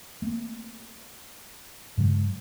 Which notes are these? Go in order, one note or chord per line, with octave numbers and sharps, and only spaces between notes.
A3 A#3 C4
G2 C#3 F#3 G#3